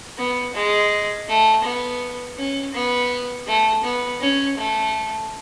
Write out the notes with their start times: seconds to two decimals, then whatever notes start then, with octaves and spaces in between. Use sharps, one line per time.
0.18 B3
0.55 G#3
1.29 A3
1.64 B3
2.38 C#4
2.74 B3
3.47 A3
3.84 B3
4.21 C#4
4.58 A3